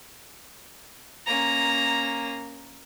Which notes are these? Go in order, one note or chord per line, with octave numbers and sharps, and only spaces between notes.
A#3 C#4 A#5